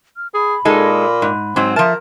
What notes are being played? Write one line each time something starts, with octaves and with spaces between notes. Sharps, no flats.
F6
G#4 B5
A#2 G#3 D#4 A4
G#2
G#2 F#3 C4
F3 A#4 E5 A5